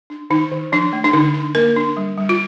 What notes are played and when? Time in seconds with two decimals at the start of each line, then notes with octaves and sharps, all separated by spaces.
0.10 D4
0.30 D#3 D#4
0.52 D#3
0.72 F3 D4
0.93 A3
1.04 D4
1.13 D3 D#4
1.34 D4
1.55 A#3 A#4
1.76 D4
1.97 G3
2.17 G3
2.29 F4